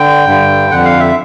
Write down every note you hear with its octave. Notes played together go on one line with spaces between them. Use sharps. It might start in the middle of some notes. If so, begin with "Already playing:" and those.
Already playing: D3 G5
G2 D3
F2 D3 F#5
F5
E5